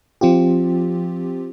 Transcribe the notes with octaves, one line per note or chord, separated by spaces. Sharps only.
F3 C4 F4 G4